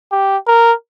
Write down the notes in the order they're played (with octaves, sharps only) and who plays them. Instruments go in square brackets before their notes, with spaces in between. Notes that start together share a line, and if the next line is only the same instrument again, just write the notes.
[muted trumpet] G4
A#4